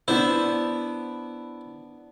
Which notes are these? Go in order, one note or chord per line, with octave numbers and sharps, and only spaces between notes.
B3 D4 E4 C5